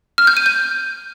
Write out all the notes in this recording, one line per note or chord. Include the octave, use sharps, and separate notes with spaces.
F6
G6
D#7
G6